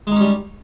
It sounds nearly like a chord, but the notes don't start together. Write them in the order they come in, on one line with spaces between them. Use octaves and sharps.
G#3 D#4 C#4 G3